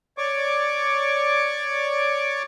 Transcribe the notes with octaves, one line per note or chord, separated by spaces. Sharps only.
C#5 D5 C#6 D6